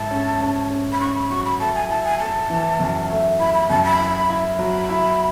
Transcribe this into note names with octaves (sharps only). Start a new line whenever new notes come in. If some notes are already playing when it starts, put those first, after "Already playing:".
Already playing: G#2 E4 A5
C#4
C#4
C#4
B5
C#4 C#6
B5
F#3 C#6
B5
A3 A5
G#5
E4 A5
G#5
A3 A5
E3
F#2
A3
E4 B5
B5
F#2 A5
B5
E4
E4
F#3 B5
E4